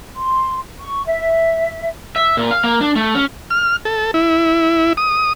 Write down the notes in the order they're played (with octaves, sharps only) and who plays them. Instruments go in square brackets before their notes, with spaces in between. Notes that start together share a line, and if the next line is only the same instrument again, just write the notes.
[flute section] C6
C#6
E5
[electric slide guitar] E5
A#2
F5
A#3
D4
A3
C#4
[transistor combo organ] F6
A4
E4
D#6